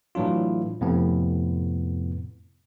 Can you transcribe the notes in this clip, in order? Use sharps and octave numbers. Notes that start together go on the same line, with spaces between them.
A2 E3 F#3 D4 F4
F2 A2 C3 B3